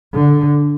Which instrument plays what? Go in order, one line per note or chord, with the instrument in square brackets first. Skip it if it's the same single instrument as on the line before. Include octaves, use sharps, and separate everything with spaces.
[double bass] D3